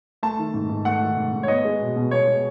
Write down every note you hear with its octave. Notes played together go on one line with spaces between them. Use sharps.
A3 A5
D#3
G#2
G#2
A3 F#5
D#3
G#2
G#2
C#5
B3 D#5
G#3
B2
B2
B3 C#5
G#3